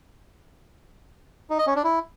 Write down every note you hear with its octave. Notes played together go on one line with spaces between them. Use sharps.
D#4
D#5
C#4
D4
E4